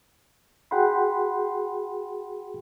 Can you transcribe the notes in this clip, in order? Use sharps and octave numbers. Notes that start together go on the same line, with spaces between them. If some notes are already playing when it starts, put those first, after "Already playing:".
F#4 G#4 F#5 G5 B5 C6